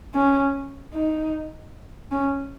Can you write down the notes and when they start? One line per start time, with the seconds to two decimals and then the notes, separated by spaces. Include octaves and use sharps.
0.14 C#4
0.93 D#4
2.11 C#4